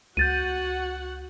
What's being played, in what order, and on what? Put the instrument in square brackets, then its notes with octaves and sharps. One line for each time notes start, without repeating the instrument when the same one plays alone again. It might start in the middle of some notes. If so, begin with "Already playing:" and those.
[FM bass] C#2 [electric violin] F#4 F#5 [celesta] G6 A6 D#7